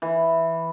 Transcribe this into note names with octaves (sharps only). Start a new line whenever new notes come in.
E3